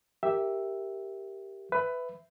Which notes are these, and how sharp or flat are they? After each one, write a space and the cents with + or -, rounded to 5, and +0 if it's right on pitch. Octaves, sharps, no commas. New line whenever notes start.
G4 +0 A#4 -5 E5 +0
B4 +15 E5 +0